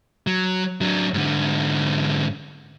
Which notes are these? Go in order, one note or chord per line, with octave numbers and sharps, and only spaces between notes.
F#3
F#3 D4
G#2 D3